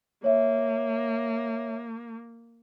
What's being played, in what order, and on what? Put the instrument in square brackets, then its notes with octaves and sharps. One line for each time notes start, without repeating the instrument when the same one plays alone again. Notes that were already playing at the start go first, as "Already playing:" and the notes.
[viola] A#3 [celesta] C#5 E5